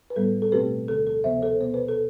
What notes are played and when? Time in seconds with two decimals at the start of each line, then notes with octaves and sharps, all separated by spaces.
0.10 B4
0.16 A2 G3 B3 A4
0.42 A4
0.52 B2 A3 C4 G4 B4
0.88 D2 D3 F3 A4
1.07 A4
1.24 D2 C3 F3 B3 C5 E5
1.42 A4 C5
1.61 B2 B3 C5
1.74 B4
1.88 A4